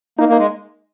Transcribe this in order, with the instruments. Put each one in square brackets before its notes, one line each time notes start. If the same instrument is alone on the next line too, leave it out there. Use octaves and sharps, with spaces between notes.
[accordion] A#3 [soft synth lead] D#4
[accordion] A#3
[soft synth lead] D#4
[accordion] G#3